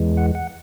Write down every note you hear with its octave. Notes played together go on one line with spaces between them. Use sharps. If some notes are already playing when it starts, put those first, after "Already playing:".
Already playing: E2 E3 G#3
F#5
F#5